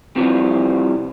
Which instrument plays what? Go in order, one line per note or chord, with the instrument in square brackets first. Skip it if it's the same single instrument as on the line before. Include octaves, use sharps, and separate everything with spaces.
[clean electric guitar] C3 E3 F3 G3